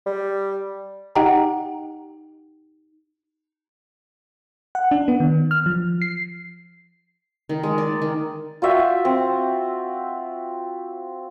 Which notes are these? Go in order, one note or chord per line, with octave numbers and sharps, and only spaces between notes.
G3
D#4 G4 D#5 F#5 G5 A#5
F#5
D4
B3
D#3
F6
F3
C7
D#3
G#3
D5
D#3
F4 F#4 E5 G5
C4